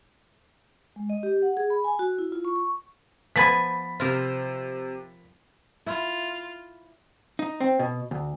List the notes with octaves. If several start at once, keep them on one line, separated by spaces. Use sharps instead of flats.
G#3
D#5
G4
F#5
G#4
B5
G#5
F#4
E4
F4
C#6
C#6
F3 B3 G#5 B5 A6 B6
C3 F4 A#4 C5
E4 F4
D#4
C4
B2
D2